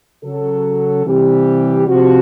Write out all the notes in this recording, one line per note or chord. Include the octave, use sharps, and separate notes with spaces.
C#3 F#3 A4
C3 E3 G3 G4
C3 F3 F#4